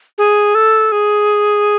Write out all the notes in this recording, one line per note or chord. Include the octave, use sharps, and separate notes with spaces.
G#4
A4
G#4